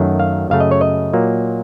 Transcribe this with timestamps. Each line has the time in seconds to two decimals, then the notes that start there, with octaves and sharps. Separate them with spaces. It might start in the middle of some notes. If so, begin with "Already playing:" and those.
Already playing: F#2 D#3 F#3 A3
0.20 F5
0.50 F#2 C#3 A3 F5
0.60 D#5
0.71 C#5
0.81 D#5
1.13 A#2 F#3 A#3